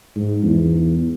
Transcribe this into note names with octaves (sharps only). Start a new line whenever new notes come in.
G#2
E2